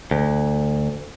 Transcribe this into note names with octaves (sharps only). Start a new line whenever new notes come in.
D2